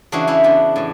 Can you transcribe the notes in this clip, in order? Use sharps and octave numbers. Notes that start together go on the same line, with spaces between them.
C#3 E3 D4 F#4
C#4 E4
B3 D4
A2 E3